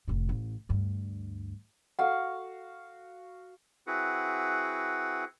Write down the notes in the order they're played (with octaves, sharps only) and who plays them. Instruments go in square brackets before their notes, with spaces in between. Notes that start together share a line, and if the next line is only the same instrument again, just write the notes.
[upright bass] F1 A2
A1
D2 G2
[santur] F#4 F5 [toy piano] A4 F#5
[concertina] C4 E4 F#4 G#4 B4 F#5